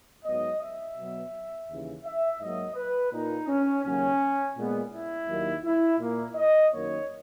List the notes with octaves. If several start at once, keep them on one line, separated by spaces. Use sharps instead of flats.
G#2 F#3 B3 D#5
E5
B2 F#3 B3
D#2 C#3 E3
E5
G#2 F#3 A#3 D#5
B4
A#2 A#3 D#4
C#4
D#2 C#3 F#3 A#3 C#4
A#2 G#3 B3
E4
D#2 D#3 F#3 A#3
E4
A#2 A#3
D#5
F#2 D#3 A#3 C#5